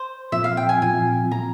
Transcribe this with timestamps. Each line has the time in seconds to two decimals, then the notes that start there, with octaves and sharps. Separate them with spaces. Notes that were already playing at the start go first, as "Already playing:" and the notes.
Already playing: C5
0.32 A#2 F3 C4 F4 E5
0.44 F5
0.57 G5
0.69 G#5
0.82 A#2 F3 C4 F4 G#5
1.31 A#2 F3 C4 F4 A#5